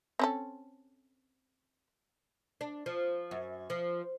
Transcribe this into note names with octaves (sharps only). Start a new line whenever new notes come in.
C4 C#4 A4
D4
F3
F#2
F3